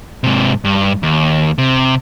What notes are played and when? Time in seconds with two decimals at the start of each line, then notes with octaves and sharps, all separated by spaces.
0.24 G#2 C3
0.64 G2
1.03 D#2
1.58 C3